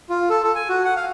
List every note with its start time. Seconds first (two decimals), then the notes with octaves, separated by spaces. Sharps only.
0.10 F4
0.30 A4
0.43 A4
0.55 G#5
0.69 F#4
0.84 F#5
0.96 F5